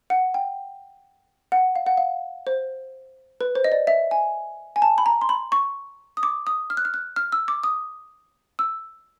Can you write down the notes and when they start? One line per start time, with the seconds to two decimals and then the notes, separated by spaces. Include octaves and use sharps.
0.10 F#5
0.34 G5
1.52 F#5
1.76 F5
1.86 F#5
1.97 F5
2.47 C5
3.41 B4
3.55 C5
3.64 D#5
3.72 D5
3.87 E5
4.11 G#5
4.76 G#5
4.82 A5
4.98 B5
5.06 A#5
5.21 C6
5.29 B5
5.52 C#6
6.17 D#6
6.23 D6
6.47 D#6
6.70 F6
6.77 F#6
6.85 F6
6.94 F#6
7.16 F6
7.32 E6
7.48 D6
7.63 D#6
8.59 E6